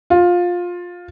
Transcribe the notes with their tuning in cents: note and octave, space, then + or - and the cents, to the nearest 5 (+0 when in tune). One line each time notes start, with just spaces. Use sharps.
F4 +15